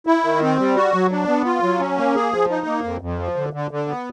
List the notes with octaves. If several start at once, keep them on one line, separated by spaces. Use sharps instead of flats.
E4
D#3
C4
G3
F#4
F#3
D4
B3
F4
F#3
C#4
A#3
G#4
F3
D#4
A#3
F2
F2
F3
D3
D3
D3
B3